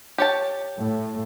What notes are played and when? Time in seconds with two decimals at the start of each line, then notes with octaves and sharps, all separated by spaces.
0.18 G4 C#5 A5
0.81 A2